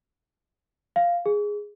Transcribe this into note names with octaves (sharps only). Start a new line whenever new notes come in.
F5
G#4